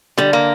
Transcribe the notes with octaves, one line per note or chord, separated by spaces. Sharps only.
D3 G3
A#3